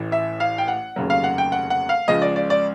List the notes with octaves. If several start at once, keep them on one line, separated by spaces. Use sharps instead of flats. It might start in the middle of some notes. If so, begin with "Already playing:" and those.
Already playing: A1 A2 E3
E5
F5
G5
F#5
F1 D#2 C#3 F#3
F5
F#5
G5
F#5
F#5
F5
C#2 C#3 F3 G#3 D#5
D5
D5
D5